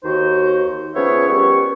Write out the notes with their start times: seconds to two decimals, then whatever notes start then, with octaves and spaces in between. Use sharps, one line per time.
0.04 D#2 D#3 D#4 F#4 C5
0.96 F3 B3 C#4 G#4 C#5 E5
1.28 G3 B3 C#4 A#4 C#6